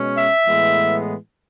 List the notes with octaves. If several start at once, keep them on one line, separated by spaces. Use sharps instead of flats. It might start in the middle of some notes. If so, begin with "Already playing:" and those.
Already playing: B2 G#3 C#4
E5
A2 E3 G#3 B3